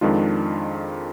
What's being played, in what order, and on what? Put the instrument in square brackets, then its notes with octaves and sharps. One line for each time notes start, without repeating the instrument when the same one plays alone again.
[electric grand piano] F2 D#3 G#3 D4 F4